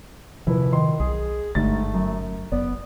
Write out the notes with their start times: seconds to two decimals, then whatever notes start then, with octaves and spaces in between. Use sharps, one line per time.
0.47 D#1 C3 F3 E4 B4
0.73 D#3 D#5 C6
1.00 B1 G#4
1.55 G1 G#2 D3 G3 A3 A6
1.94 F#2
2.52 F#1 B3 D5